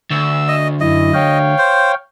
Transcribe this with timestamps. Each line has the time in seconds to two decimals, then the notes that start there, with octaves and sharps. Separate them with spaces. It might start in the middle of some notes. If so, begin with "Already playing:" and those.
0.10 D2 E6
0.48 D#5
0.80 F#2 E4 D#5
1.14 C#5 F5 G5
1.58 C5